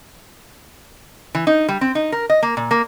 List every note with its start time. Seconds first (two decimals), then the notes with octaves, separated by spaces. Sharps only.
1.35 E3
1.47 D#4
1.68 G3
1.81 C4
1.95 D#4
2.12 A#4
2.30 D#5
2.42 A#3
2.57 A#2
2.71 A#3